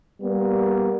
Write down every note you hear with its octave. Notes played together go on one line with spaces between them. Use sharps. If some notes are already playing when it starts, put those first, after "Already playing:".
G3 A#3 B3